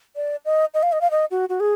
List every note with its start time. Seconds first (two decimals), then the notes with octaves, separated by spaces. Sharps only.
0.16 D5
0.45 D#5
0.74 D#5
0.83 F5
0.92 D#5
1.01 F5
1.11 D#5
1.31 F#4
1.49 F#4
1.60 G#4